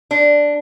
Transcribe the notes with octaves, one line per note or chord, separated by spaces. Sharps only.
D4